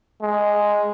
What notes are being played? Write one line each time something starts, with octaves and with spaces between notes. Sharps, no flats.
G#3